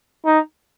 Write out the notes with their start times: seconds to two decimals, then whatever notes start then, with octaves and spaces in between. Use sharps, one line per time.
0.25 D#4